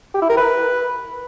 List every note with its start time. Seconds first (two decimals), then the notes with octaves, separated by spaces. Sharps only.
0.14 G4
0.22 E4
0.29 A#4
0.37 B4